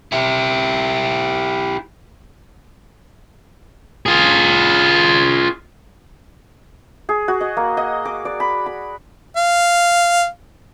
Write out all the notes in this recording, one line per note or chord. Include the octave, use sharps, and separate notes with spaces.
E4 G4
F4 G#4
G#4
F#4
D#5
A#3
D#5
D6
D5
B5
B5
F5